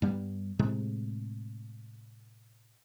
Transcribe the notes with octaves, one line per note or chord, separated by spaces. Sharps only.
G2 G3 B3
A2 C3 G#3